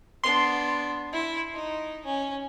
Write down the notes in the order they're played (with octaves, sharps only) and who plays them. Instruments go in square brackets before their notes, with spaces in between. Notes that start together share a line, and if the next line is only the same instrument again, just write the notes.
[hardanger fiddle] B3 D4 [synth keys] C6
[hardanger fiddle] E4
D#4
C#4